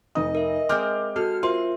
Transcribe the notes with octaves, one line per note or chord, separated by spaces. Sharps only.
F1 D#4 D#5 D#6
A#4 E5
G#3 C4 G#4 D6 F6 G6
F#4 A4 F6
F4 A#4 C5 E5 F5 C6